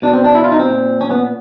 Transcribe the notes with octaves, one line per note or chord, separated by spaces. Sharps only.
B2 D4
C4
D4
E4
F4
D#4
C4
A#2
C#4
B3